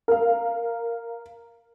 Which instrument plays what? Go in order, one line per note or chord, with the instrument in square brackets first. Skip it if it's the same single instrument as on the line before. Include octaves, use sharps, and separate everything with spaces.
[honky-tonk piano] A#4 F5